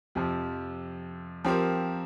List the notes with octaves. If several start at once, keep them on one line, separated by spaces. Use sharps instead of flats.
F2 C3 F3
F3 C4 G4 A#4